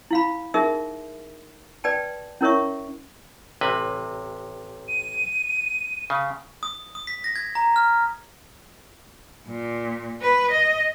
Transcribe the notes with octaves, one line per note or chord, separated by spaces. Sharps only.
E4 F5 B5
D#4 G#4 A#4 E5
B4 D5 G5 A5
C#4 E4 A#4 C#5 E5 C#6
A1 C3 B4
D#7
C#3
D#6
D#6
B6
A#6
G#6
A#5
F6
A#2
B4
D#5